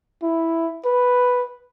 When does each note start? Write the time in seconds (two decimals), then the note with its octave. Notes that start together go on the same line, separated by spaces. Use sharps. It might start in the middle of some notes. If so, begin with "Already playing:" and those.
0.22 E4
0.85 B4